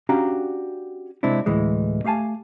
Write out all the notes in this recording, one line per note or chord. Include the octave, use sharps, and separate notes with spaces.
C#4 D4 F#4 G4 F5 A#5
C3 G#3 C4 D4 E4
D2 A2 E3 G#3
A3 G4 F5 G#5 A5